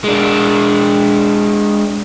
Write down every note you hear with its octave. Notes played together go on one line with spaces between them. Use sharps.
G#3 D4